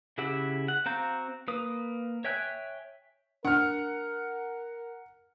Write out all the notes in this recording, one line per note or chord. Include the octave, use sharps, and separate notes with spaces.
C#3 E4 G4 F#5 E6
F#5
C4 F#4 F5 A#5 G6
A#3 B4 D#6
C#5 E5 G5 G#5 F#6
D4 A#4 F#5 F6